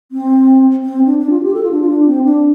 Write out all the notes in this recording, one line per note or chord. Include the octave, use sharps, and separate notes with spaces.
C4
C4
D4
D4
F4
G4
A4
F4
D4
F4
D4
C4
D4